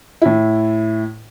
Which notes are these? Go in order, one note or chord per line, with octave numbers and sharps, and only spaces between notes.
A2 E4